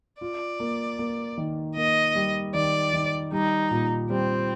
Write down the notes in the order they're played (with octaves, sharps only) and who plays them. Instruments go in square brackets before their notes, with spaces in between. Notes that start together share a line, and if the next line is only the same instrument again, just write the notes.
[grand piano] F4 [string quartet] D5
[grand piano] A#3
A#3
D#3
[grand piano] A#3 [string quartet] D#5
[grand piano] G3
[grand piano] D#3 [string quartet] D5
[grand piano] D#3
[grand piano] G3 [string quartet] D#4
[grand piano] A#2
[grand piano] G3 [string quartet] C4